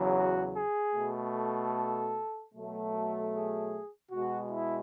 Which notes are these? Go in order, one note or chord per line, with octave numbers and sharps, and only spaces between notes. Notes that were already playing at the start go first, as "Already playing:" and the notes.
Already playing: E2 C#3 F#3
F#4
G#4
B2 A3
A4
B2 F#3 A3
A4
G#4
B2 G#3 F#4
E4